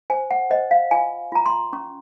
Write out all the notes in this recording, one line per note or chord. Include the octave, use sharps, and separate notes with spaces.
C5 G#5
F#5
C5 D#5
F5
F4 G#5
F4 A#5
C6
C#4 C#6